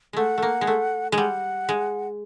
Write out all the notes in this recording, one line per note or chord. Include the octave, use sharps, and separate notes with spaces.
G#3 A3 F#5
A3 A#3
G#3
A3
G#3
G3 F#5
G#3